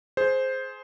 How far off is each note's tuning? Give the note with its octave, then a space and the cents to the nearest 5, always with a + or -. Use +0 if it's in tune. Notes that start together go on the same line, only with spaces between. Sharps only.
G#4 +20 C5 +0